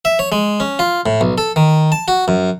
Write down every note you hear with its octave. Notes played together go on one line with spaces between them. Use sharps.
E5
C#5
G#3
C#4
F4
A2
B1
A4
D#3
A5
F#4
F#2